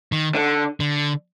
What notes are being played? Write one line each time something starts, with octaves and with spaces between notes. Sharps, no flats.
D#3
D3
D3